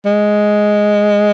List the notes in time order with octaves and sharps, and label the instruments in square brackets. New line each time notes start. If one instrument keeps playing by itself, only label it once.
[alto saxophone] G#3